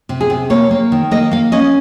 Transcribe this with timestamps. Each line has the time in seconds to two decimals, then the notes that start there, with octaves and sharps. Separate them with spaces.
0.09 C3
0.21 G#4
0.30 C3
0.50 A#3 C#5
0.71 A#3
0.92 D#3
1.11 A#3 D#5
1.32 A#3 F5
1.52 C#4 D#5